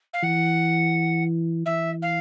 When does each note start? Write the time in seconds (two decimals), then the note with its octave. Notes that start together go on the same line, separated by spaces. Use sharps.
0.14 F5
0.23 E3 F#5
1.66 E3 E5
2.02 F5